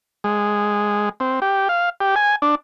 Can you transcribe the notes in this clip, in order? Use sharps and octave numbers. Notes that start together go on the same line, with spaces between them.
G#3
C4
G4
F5
G4
G#5
D4